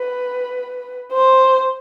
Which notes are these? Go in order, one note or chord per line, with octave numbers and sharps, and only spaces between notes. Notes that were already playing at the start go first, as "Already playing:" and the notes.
Already playing: B4
C5